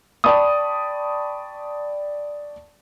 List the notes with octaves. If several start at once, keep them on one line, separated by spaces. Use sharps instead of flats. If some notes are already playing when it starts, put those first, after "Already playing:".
D5 G5 A5 B5 C#6 D#6